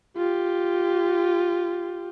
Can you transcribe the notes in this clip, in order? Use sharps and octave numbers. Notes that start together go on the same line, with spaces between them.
F4 G4